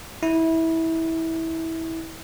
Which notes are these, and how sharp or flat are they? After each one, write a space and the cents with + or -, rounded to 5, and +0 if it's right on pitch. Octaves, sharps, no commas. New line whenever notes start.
E4 -20